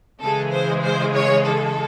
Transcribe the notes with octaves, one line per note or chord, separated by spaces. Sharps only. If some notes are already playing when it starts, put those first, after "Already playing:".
C#3 E3 G#3 A4
C5
C5
C#5
A4